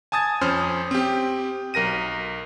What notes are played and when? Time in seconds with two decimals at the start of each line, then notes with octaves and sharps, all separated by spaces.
0.12 G#5 A5 D#6 G#6 A6
0.41 F2 C#4 C5 D#6 F6
0.91 C4 G4
1.74 B1 A#4 A#6 D#7